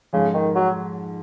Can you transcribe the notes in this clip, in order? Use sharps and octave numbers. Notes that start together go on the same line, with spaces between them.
F2 G#2 C#3
D#3
F#3